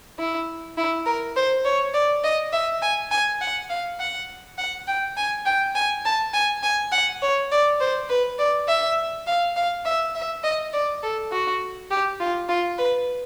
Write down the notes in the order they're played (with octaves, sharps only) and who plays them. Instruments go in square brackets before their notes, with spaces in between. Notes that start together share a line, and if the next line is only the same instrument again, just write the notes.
[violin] E4
E4
A#4
C5
C#5
D5
D#5
E5
G#5
G#5
F#5
F5
F#5
F#5
G5
G#5
G5
G#5
A5
G#5
G#5
F#5
C#5
D5
C5
B4
D5
E5
F5
F5
E5
E5
D#5
D5
A4
F#4
G4
F4
F4
B4